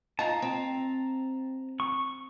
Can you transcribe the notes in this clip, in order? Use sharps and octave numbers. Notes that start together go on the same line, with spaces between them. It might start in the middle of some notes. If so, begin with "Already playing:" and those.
D#4 F4 A5 A#5
C4
C#6